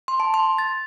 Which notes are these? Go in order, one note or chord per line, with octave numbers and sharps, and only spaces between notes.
C6
A5
C6
A6